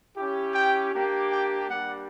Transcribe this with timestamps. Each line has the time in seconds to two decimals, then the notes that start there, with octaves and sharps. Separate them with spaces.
0.15 C#4 E4 G4
0.54 G5
0.92 A#3 D4 G4
1.30 G5
1.69 G3 A#3 D4 G4 F#5